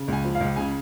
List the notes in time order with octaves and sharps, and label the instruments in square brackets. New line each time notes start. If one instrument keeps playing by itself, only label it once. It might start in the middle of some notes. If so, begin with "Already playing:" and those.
Already playing: [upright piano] C#3
C#2 G#5
F3
F5
C#2
C#3 G#5